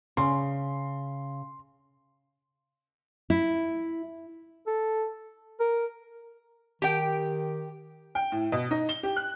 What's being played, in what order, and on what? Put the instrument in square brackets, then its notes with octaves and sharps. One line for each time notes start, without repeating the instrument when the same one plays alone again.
[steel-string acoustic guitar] C#3 [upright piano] C6
[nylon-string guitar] E4
[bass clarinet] A4
A#4
[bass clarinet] D#3 [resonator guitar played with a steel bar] G4 G5
[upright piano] G5
A2
B2
D#4
G7
G4
F#6